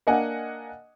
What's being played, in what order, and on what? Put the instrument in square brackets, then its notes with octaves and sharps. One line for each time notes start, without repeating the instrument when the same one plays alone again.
[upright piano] A#3 D4 D#5 F#5 G#5